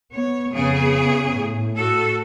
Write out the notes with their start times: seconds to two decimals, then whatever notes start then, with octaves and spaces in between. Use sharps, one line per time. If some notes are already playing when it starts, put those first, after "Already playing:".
0.13 B3 C#5
0.53 F2 C#3 B3 G#4
1.32 A2
1.76 F#4 A4